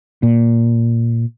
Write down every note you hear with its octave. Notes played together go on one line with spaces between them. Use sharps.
A#2